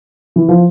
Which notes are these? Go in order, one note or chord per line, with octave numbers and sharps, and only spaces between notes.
E3
F3